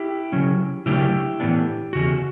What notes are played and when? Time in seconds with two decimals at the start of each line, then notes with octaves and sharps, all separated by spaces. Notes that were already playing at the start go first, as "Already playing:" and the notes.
Already playing: E4 G4
0.32 C#3 F#3 C#4
0.86 C#3 F#3 A3 D4 E4 G4
1.40 A2 E3 B3 D4
1.93 E2 C#3 F#4